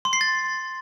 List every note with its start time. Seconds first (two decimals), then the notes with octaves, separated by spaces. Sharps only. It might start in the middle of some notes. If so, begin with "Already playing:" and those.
0.05 C6
0.13 C7
0.21 A6